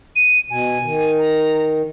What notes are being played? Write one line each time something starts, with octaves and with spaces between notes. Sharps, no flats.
D#7
B2 G#5
D#3
A#5